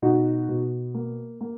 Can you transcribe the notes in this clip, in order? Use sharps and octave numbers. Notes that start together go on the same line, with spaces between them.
B2 D#4 F#4
B2
A#3
A#3